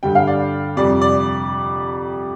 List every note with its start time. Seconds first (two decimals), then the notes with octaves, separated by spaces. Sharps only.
0.03 G2 D3 G3 G5
0.15 F5
0.27 D5
0.77 F2 C3 G3 D5
1.01 D5